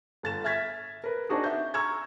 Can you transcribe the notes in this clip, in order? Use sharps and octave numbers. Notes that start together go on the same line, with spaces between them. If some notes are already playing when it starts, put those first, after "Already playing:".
G1 A6 E7
E5 F6 G#6 A6 B6
A#4 B4
C4 D4 D#4 F#4 G#4
E5 G6
A#5 C#6 E6 F6 G#6